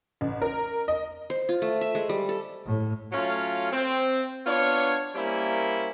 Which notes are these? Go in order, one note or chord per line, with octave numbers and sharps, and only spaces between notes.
A1
A#4
D#5
C5
F4
A3
E5
G#3
G3
A4
A2
F#3 A3 C#4 F4
C4
B3 D4 F4 C#5
G3 A#3 C4 C#4 E4